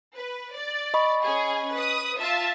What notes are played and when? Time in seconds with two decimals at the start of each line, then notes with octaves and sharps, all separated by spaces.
0.15 B4
0.53 D5
0.94 D#5 B5 C#6
1.23 C#4 G#4 G#5
1.73 B4 D#6
2.21 F4 E5 A5